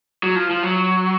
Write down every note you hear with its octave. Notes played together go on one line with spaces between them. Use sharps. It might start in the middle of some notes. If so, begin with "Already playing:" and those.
F#3
F3
F3
F#3